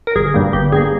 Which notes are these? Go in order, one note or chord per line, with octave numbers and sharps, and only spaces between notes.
A#4
G1 G#4
G2 G3 A#3
G1 G4
G2 G3 A#3 G#4